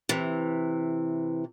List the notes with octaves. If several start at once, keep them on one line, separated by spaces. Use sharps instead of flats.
C3 E3